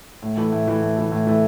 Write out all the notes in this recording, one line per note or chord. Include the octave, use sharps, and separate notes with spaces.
A2
E3 A3
A2
E3 A3
A2
E3 A3
A2
E3 A3